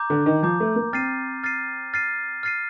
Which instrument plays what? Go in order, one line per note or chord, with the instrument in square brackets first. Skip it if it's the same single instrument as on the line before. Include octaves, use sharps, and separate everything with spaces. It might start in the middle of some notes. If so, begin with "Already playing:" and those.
Already playing: [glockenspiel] A#5 D6 G6
[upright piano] D3
D#3
[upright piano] F3 [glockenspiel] A#5 D6 G6
[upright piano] A3
A#3
[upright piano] C4 [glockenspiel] F6 A6 C7 D#7
[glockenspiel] F6 A6 C7 D#7
F6 A6 C7 D#7
F6 A6 C7 D#7